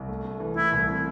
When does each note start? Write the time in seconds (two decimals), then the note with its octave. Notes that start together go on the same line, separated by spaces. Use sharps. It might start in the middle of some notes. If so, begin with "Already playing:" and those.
Already playing: C2
0.09 A3
0.25 A3
0.40 E3
0.56 A3 E4
0.72 C2
0.88 C3